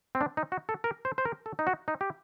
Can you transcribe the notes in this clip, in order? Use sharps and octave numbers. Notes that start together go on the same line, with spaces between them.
C4
D4
D#4
F#4
A4
A#4
C5
C5
A#4
A4
D#4
F#4
D#4
G4